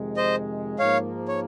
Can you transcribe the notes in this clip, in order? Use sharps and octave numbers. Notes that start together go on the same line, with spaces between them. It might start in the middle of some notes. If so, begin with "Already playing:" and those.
Already playing: F2 C3 D#3 G#3
C5 D#5
G#2 F3 A#3 C#5 F5
C#5